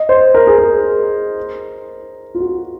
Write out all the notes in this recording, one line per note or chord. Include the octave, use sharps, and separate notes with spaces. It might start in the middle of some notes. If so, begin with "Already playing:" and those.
Already playing: D#5
C5
A#4
G#4
A#4
F4
F#4